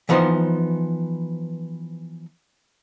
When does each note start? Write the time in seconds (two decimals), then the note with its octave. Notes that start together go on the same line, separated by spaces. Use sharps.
0.09 E3 F3 B3 D#4 C5